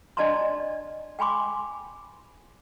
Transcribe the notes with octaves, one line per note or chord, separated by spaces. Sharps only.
D4 D5 D#5 A5 A#5 C6
G5 G#5 B5 C6 D6